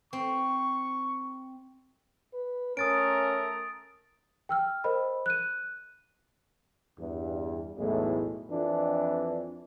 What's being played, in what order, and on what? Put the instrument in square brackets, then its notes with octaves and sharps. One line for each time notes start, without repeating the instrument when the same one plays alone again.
[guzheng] C4 [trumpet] C#6
[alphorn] B4
[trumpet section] A3 A#4 [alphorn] C#4 [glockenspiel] D#6 A6 D7
[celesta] G5 E6 F6
A#4 C5 D#5 B5
F#6 D#7
[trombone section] E2 G2
B1 E2 A2 E3 G#3 A3
F2 E3 D4